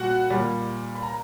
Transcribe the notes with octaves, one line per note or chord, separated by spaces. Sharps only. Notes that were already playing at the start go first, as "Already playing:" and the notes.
Already playing: A#2 G3 F#4 F#5
A#2 G3
B5
A#5